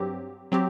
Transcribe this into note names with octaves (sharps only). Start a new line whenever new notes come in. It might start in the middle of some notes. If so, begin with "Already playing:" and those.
Already playing: G2 F#3 C4 G4
F#3 C4 G4